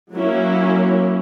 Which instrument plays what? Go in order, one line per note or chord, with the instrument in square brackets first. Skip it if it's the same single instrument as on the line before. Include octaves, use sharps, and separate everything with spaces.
[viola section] F#3 A#3 C#4 E4